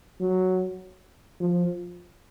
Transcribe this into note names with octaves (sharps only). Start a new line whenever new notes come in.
F#3
F3